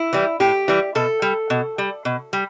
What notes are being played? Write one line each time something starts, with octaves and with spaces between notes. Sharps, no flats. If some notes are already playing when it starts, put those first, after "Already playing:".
Already playing: E4
E3 G3
A2 G4
E3 G3
B2 A4
G3
B2
G3
B2
G3